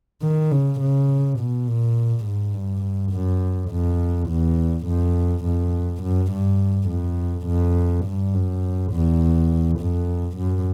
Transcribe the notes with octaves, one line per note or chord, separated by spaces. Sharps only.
D#3
C#3
C#3
B2
A#2
G#2
G2
F#2
F2
E2
F2
F2
F#2
G2
F2
F2
G2
F#2
E2
F2
F#2